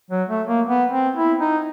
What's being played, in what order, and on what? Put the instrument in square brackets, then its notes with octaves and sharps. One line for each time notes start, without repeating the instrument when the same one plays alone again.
[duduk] F#3
A3
A#3
B3
C4
E4
D#4